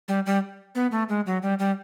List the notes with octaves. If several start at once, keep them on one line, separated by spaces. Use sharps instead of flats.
G3
G3
B3
A3
G#3
F#3
G3
G3